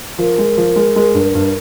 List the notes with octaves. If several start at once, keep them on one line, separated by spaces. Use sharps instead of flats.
F3 A#4
G#3
F3
G#3
G#3
G2
G2